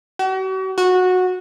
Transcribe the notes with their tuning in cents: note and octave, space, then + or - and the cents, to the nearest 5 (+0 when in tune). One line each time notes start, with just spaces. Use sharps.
F#4 +40
F#4 -15